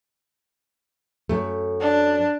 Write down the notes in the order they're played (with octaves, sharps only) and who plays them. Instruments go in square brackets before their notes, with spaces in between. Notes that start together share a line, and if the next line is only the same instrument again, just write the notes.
[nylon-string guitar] F#2 A3
[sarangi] D4